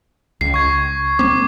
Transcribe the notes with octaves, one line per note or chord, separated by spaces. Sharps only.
C#2 C7
C#6 G#6
A#3 C4 D6